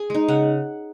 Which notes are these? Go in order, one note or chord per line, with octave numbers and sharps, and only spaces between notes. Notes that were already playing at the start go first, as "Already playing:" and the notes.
Already playing: G#4
G#3 D#4
C#3 F#5